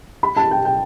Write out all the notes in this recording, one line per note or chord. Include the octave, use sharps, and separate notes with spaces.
B5
A5
G5
G5